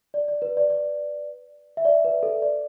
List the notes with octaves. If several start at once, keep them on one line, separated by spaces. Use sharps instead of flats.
D5
D5
B4
D5
D5
E5
D5
B4
A4
D5